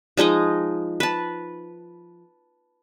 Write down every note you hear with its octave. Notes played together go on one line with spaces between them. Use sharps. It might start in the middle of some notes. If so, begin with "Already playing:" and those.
F3 G#3 D#4 D#5
B4 A5